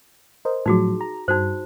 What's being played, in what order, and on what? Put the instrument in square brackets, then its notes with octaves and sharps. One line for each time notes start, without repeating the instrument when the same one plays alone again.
[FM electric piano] A#4 C5 D#5
[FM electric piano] A2 F3 F#3 [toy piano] D#4 F#4 G#4
[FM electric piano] A#5
[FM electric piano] G2 [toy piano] D#4 F#4 C5